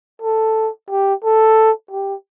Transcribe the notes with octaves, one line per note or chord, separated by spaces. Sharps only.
A4
G4
A4
G4